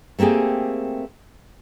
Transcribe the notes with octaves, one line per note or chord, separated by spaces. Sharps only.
A3 A#3 C4 G4 G#4